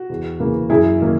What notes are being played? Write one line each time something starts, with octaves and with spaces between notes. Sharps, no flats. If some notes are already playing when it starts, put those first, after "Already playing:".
Already playing: F#4
E2
C#3 E3 A#3
F#2 E4 G#4
D#3 A#3 C#4